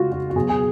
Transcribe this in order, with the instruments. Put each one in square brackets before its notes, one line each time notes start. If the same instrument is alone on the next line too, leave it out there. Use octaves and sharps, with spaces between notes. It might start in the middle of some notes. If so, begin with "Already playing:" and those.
Already playing: [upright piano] C#3 G#3 F4 F#4
F#4
F#4
B2 F#3 G#4
G#4